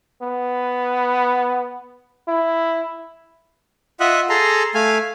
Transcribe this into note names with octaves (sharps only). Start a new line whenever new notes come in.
B3
E4
F4 D#5 E5 F#5
G#4 A4 A#5 C6
A3 F5 G#5